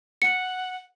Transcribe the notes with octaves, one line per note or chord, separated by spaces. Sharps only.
F#5 C#7